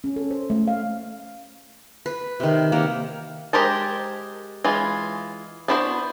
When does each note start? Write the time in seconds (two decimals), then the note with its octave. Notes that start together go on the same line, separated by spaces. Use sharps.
0.04 C#4
0.16 A4
0.31 C5
0.50 A3
0.68 F5
2.06 B4
2.40 C3 D#3
2.72 A#3 G4 F#5
3.53 G#3 G4 A#4 C5 A5
4.64 E3 G#3 F4
5.68 B3 D4 E4 F#4 C5